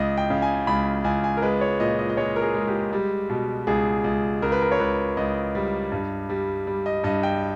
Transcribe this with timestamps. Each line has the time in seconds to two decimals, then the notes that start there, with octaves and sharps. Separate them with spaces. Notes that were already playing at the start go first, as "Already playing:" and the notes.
Already playing: C#2 D#5
0.17 G5
0.30 C#3
0.42 G#5
0.67 C#2 B5
1.04 C#2 G#5
1.24 G#5
1.37 A#4
1.42 G#3 B4
1.61 C#5
1.80 A#2 D#5
1.99 D#5
2.09 D#5
2.17 G#3 C#5
2.36 A#4
2.42 G#4
2.55 G#3
2.67 G4
2.93 G3
3.30 B2
3.67 C#2 G#4
4.04 C#2
4.42 C#2 A#4
4.52 B4
4.61 A#4
4.71 C#5
4.80 C#2 B4
5.17 C#2 D#5
5.55 G3
5.92 G2
6.29 G3
6.67 G3
6.86 D#5
7.04 G2 D#5
7.23 G5